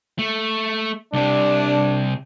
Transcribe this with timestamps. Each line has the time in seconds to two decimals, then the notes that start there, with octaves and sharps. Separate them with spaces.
0.19 A3
1.14 C2 C3 D4